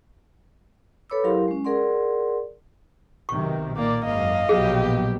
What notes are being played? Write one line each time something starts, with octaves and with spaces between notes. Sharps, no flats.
A4 B4 C#5 B5 D6 E6
F#3 E4 G4 A#4 F5 C6
G#3 C#4
G#4 A#4 D5 F#5 C6
B1 C3 D#3 C#6
A#2 A#3 D5 D6
G#1 F#2 A#3 D#5 F5
A#1 B2 F#3 G4 G#4